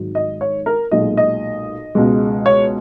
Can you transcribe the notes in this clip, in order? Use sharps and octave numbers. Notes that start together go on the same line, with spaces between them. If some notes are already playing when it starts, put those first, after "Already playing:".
Already playing: G#1 G#2 F#3
D#5
C#5
A#4
B1 A#2 G#3 D#5
D#5
C#2 B2 G#3
C#5